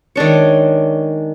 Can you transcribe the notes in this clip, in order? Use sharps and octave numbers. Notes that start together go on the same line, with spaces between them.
D#3 G#3 D4 C#5